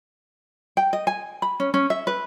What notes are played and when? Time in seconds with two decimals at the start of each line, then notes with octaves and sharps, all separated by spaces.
0.77 G5
0.93 D#5
1.07 G#5
1.42 B5
1.60 C#4
1.74 C#4
1.90 E5
2.07 B4